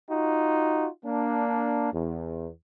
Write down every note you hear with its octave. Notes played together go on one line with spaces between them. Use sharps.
D#4 F4 F#4
A#3 D4
E2